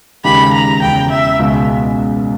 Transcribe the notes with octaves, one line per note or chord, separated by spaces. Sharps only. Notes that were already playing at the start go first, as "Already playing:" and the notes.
D#2 C#3 G#3 D#4 G4 B5
A#5
E1 E2 C#3 G5
E5
C#2 B2 G#3